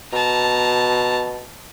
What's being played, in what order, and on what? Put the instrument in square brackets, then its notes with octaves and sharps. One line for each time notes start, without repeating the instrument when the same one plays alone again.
[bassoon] B2 [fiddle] A5 A#5